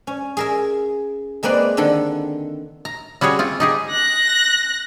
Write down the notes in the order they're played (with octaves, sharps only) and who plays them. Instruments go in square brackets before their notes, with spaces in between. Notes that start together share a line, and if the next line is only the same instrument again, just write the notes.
[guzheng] C#4
G#4 A#4 E5
G#3 A#3 C4 B4 D5
D3 D#3 A4
[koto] A#5
G3 C#4 F#4 G#4 C#5
C4 F4
D#4 G4 G#4
[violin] F#6 A#6